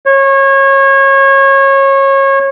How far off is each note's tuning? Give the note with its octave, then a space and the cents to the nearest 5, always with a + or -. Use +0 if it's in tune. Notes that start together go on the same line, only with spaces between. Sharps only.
C#5 -25